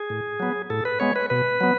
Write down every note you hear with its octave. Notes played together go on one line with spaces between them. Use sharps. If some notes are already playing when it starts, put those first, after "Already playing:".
Already playing: G#4
A2
F#3 B3
A2 A4
B4
G#3 B3 C#5
B4
B2 B4
F#3 B3